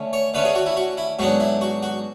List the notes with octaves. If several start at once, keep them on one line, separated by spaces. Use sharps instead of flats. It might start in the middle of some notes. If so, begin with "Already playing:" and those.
Already playing: D3 A3 C#4
C#5
D3 A3 C#4 B4
G#4
F#4
E4
F#4
E4
G#2 F#3 B3 D4 F#4
E4
F#4
F#4